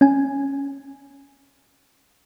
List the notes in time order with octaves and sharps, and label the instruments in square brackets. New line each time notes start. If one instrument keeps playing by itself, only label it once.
[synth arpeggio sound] C#4 G#5